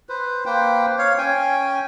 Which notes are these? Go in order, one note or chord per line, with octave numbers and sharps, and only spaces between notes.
B4 C5
A#3 B4 C5 G5
C#5 F5
C#4 G5 G#5